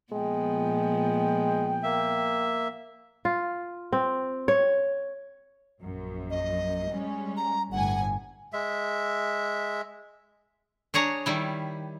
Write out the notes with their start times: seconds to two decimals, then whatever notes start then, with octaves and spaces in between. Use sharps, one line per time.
0.13 A#2 F3 G#3 B3 G5
1.83 A#3 E5
3.25 F4
3.93 C4
4.48 C#5
5.82 A#1 F#2
6.30 D#5
6.89 G3 G#3 C#4
7.37 A#5
7.72 G1 A2 F#5 G#5
8.53 G#3 E5
10.94 D4 G#4 C#5 A#5
11.26 D#3 G3 E4